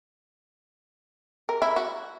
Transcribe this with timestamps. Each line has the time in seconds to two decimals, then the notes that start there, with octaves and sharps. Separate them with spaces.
1.49 A#4
1.62 E4
1.76 F#4